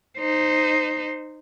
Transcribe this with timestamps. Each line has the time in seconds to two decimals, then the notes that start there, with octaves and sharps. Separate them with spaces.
0.19 D#4 C5